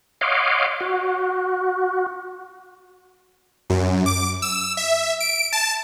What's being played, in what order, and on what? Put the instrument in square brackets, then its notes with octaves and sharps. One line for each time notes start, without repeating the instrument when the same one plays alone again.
[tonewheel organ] C#5 D#5 F5 F#5 C6 D6
F#4
[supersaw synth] F#2
D6
E6
E5
D7
A5